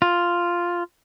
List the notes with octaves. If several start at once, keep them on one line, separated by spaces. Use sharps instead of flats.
F4